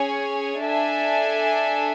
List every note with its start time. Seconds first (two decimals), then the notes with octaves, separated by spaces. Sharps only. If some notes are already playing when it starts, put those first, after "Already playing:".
Already playing: C#4 G#4 C#5 G#5
0.60 D4 A4 E5 G#5